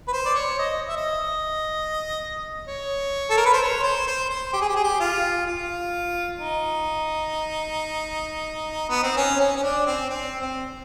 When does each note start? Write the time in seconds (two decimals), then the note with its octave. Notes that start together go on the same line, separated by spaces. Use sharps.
0.08 B4
0.13 C5
0.26 D5
0.35 C#5
0.59 D#5
0.82 D#5
0.89 E5
0.97 D#5
2.68 C#5
3.30 A4
3.37 A#4
3.46 B4
3.53 C5
3.60 C#5
3.83 C5
4.07 C5
4.30 C5
4.53 G4
4.61 G#4
4.69 G4
4.76 G#4
4.84 G4
5.00 F4
5.46 F4
6.39 D#4
8.90 B3
9.03 C4
9.17 C#4
9.40 C#4
9.57 C#4
9.63 D4
9.87 C4
10.10 C4
10.41 C4